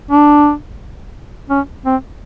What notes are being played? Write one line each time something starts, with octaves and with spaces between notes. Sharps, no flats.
D4
C#4
C4